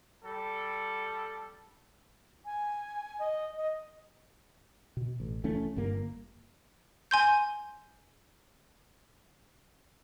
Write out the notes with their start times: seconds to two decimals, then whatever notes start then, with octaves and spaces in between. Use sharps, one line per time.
0.24 G3 A4
2.45 G#5
3.19 D#5
3.57 D#5
4.97 B2
5.20 A1
5.44 C2 E3 A3 C#4
5.76 G1 G2 A#3
7.11 G#5 C6 G6